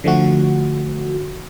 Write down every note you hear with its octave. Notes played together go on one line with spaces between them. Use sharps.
D3 F3 A3 F#4